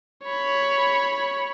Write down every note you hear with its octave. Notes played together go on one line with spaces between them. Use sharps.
C#5 B5